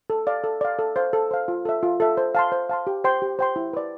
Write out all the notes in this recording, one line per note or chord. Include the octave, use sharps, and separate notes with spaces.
A4
D5 F5
A4
D5 F5
A4
C5 F5
A4
C5 F5
F4
A4 E5
F4
A4 E5
C5
F5 A5 C6
C5
F5 A5 C6
G4
C5 G5 C6
G4
C5 G5 C6
E4
B4 D5